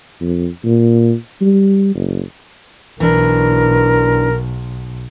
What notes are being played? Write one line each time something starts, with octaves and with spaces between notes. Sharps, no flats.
F2
A#2
G3
F#1
B1 E3 D4 A#4